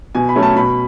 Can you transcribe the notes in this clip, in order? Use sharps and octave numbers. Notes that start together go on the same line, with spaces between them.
B2 G#5
B5
F#3 A3 C#4
A5
B2 B5